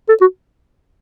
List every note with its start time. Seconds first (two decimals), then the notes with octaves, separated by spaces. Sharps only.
0.09 A4
0.21 F#4